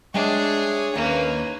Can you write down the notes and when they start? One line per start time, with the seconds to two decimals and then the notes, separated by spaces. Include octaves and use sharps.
0.14 G#3 D4 G#4 C#5 E5 G5
0.95 D#2 A#3 C#4 B4